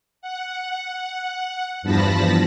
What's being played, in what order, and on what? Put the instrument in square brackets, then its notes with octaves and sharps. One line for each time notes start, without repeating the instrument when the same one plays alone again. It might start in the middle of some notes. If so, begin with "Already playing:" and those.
[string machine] F#5
E2 G2 F3 A5 B5 A#6